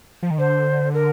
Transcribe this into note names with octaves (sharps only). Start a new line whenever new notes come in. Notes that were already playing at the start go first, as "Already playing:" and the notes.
F3
D#3
D3 C5
A#4